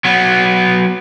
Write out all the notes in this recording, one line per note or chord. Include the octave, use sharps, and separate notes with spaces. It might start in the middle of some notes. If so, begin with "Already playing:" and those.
F#3 B3